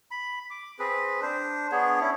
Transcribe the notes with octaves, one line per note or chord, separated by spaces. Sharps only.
B5
D6
C4 G#4 B4
D4 C5
B3 D4 G#4 C#5
C#4 E4 C#5